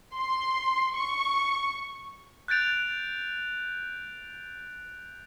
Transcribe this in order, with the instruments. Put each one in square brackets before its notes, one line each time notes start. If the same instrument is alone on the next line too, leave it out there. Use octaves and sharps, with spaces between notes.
[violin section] C6
C#6
[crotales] F#6 G6 A6 D7 F7